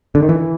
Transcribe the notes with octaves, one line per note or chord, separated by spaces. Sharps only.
D3
D#3
E3